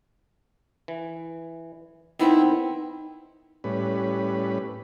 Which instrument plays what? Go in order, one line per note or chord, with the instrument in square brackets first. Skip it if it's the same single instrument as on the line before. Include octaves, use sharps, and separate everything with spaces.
[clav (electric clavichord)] E3
[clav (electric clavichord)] D#3 B3 C4 [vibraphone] D#4 [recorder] E4
[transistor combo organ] A2 G3 C#4 B4